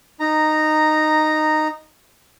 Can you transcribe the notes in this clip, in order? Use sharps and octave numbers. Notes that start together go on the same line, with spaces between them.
D#4 A#5